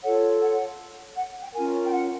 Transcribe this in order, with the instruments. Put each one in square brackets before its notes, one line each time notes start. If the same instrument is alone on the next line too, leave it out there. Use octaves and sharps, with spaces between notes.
[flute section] F4 A4 C#5 F#5
F#5
F#5
G5
C#4 F4 A#4 G#5
G5
F#5